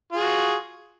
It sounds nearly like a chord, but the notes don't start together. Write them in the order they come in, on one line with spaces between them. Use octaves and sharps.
F4 G#4 F#4